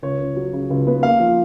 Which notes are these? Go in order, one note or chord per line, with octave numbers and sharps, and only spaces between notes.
C#2 C#5
C#2
F#3
C#3
C#2
B3
A#3 F5
F3